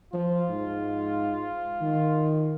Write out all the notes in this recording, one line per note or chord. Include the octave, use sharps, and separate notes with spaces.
F3 F4
G#2
D#3